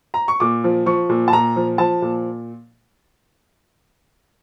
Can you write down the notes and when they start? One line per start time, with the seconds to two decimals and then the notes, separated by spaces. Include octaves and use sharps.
0.14 A#5
0.28 C#6
0.40 A#2 D6
0.64 F3
0.86 F3 C#6
1.10 A#2
1.28 A5
1.33 A#2 A#5
1.56 F3
1.78 F3 A5
2.02 A#2